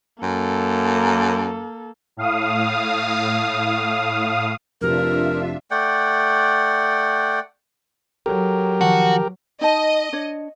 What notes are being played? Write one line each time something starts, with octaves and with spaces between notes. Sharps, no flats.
F#2 A#3 A4
A2 F5 D#6
F1 C3 D4 F4 A#4 B4 E5
A3 D5 F#5 G5
F#3 G4 A4 A#4
D#3 F3 F#4 A5
D#4 D#5 A5
D4 C#5